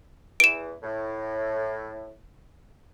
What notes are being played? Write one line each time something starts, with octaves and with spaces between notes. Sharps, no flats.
E2 E3 D7 E7
A2